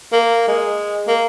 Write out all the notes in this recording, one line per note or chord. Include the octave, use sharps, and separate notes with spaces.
A#3
G#3
A#3